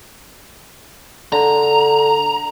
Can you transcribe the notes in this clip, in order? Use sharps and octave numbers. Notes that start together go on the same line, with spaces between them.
D3 A#5